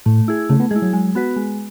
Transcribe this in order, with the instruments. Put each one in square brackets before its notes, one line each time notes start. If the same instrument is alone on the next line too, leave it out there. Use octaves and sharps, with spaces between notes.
[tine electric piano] A2 [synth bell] A3
[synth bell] E4 G#4
[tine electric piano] C#3 [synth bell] A3
[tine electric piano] B3
[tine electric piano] G#3 [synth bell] G#4
[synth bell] E4
[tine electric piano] F#3
[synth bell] G#3
B3 F#4 B4
G#3